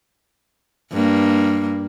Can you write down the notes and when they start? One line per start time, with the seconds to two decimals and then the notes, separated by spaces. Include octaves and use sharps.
0.92 G2 A#3